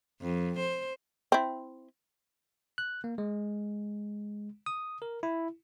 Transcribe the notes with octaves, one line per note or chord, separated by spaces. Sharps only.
F2
C5
C4 E4
F#6
A#3
G#3
D#6
A#4
E4